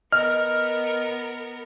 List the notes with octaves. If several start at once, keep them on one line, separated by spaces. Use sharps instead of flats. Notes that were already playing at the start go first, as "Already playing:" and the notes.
B3 A#4 D#5 F6